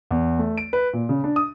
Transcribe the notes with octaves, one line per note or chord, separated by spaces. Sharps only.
E2
A3
D7
B4
A#2
C#3
D4
D#6